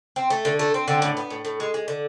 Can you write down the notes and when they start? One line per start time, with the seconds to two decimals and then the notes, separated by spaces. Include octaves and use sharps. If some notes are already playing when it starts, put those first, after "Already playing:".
0.16 C4
0.30 A3
0.45 D3
0.59 A3
0.74 C4
0.88 D3
1.02 A2
1.17 B3
1.30 A2
1.45 A2
1.60 G#3
1.74 G#3
1.88 D3